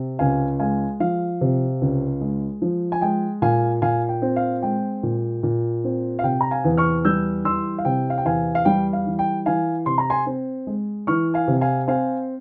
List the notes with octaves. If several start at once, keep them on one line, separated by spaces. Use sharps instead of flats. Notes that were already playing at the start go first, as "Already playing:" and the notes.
Already playing: C3
C#2 F5 G#5
G#3 F5 G#5
F3 F5
C3
C#2
G#3
F3
G#5
G#3 G5
A#2 F5 G#5
A#2 F5 G#5
G5
C4
F5
G#3 G5
A#2
A#2
C4
F5
C3 G5
A#5
F5 G#5
E2
C#6 F6
G3 E6 G6
E3 C6 E6
F5
C3 G5
F5
G5
E2 F5 G#5
F5
G3 G5
F5
E3
G5
E3 F5 G#5
C3 C6
A#5
G#5 C6
C4
G#3
E3 C#6 F6
F5 G#5
C3
F5 G#5
C4 F5 G#5